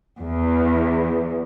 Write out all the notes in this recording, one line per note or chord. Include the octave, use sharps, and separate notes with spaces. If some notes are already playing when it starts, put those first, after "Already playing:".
E2